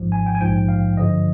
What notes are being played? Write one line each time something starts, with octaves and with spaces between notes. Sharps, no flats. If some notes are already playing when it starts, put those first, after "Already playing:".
Already playing: G#1 G#2 F3
G#5
G5
G#5
A#1 G#2 F3 G5
F5
G2 D3 F3 D#5